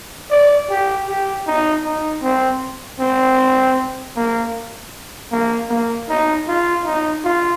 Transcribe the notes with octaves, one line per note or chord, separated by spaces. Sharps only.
D5
G4
G4
D#4
D#4
C4
C4
A#3
A#3
A#3
D#4
F4
D#4
F4